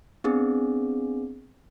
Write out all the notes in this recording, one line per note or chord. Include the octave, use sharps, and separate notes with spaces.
B3 C4 D4 G#4